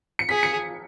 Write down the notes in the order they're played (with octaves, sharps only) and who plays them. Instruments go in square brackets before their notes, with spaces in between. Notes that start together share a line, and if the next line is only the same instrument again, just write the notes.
[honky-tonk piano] C#7
[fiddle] G#4 [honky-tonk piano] B6
[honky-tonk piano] C#7